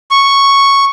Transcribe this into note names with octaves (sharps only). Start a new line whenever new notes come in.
C#6